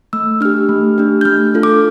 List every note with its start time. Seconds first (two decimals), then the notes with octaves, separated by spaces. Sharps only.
0.13 A3 E6
0.41 D4 G4 F6
0.69 A3
0.98 D4 G4
1.21 G6
1.25 A3 F6
1.54 D4 F4 A4
1.63 D6